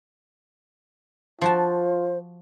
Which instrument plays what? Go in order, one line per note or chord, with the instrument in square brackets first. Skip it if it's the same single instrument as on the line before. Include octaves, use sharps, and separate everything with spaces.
[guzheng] F3 F#4 A5 [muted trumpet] F4 [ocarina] C5